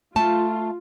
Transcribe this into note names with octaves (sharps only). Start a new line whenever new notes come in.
A3 F4 A5